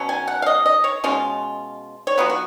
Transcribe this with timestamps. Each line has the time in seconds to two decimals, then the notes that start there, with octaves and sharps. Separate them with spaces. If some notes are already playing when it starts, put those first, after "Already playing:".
Already playing: B2 F#3 C#4
0.09 G#5
0.28 F#5
0.42 F5
0.46 D#5
0.66 D#5
0.84 C#5
1.04 B2 G#3 C#4 F4
2.07 C#5
2.17 F#3 B3 F4 B4
2.30 F#4